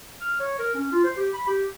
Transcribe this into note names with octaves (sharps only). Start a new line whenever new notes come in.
F6
C#5
A#4
C#4
F4
C5
G4
B5
G4